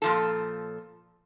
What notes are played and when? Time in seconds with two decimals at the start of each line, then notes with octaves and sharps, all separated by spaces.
0.02 A#2 F3 A4